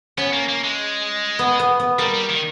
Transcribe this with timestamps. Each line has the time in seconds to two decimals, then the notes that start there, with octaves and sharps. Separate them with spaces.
0.18 B3 C#4
0.33 A#3
0.49 A#3
0.64 G#3
1.39 B3
1.59 B3
1.80 B3
1.99 G3 A#3
2.14 G3
2.29 D#3